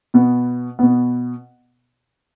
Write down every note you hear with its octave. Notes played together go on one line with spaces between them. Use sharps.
B2 B3
B2 B3